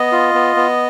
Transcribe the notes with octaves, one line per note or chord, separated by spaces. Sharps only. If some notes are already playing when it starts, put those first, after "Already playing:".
Already playing: B3 D#5
F4
B3
B3